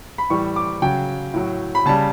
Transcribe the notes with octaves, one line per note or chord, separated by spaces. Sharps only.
B5
A2 E3 G3 C#6
D6
C#3 F#3 G5
A2 F#3
B5
C#3 G3 A5